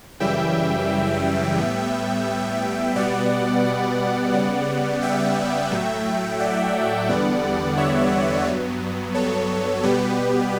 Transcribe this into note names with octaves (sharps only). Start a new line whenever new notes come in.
F#2 C#3 E3 G3 E5 G5
A2 G3 B3
B2 G3 B3 D5 F#5
D5 F#5
C#3 G3 B3
E5 G5
A2 F#3 A3
D5 F#5
E2 D3 G3 B3
C#5 E5
G2 F#3 B3
A4 C#5
B2 G3 B3 G4 B4